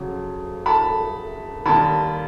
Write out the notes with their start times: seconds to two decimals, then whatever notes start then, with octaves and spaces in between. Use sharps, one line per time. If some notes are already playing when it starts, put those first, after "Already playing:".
Already playing: F2 C#3 F#3
0.66 A5 B5
1.66 D#2 D#3 G3 A5 B5